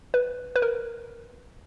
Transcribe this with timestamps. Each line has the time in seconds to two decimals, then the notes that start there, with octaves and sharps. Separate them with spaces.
0.14 B4
0.56 B4
0.62 A#4